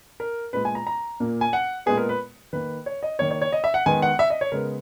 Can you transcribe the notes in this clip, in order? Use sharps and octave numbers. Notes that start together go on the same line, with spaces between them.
A#4
A#2 G#3 B3 B4
G#5
A#5
A#5
A#2 A#3
G#5
F#5
A#2 G#3 B3 G#4
A#4
B4
D#3 A#3 B4
C#5
D#5
D#3 A#3 C#5
C#5
C#5
D#5
E5
F#5
D#3 G#3 B3 G#5
F#5
E5
D#5
C#5
C#3 G#3 B3 A#4